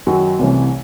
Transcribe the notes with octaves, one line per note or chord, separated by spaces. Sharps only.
F#2 D#3 F#3 C#4 F#4
C2 C3 E3 A3 C#4